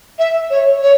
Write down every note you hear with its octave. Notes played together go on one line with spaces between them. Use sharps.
E5
C#5
C#5